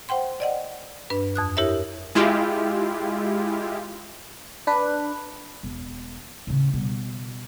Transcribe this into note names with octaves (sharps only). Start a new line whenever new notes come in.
C5 F#5 G5 C6
D5 D#5 F#5
G2 D4 B4
F2 D#6 F#6
E4 G4 A#4 C#5 E5
G#3 E4 F4 G4
D4 B4
E1
A2 C#3
B2 G3